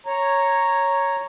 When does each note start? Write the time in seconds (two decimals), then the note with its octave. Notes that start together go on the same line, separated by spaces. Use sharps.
0.06 C#5 A#5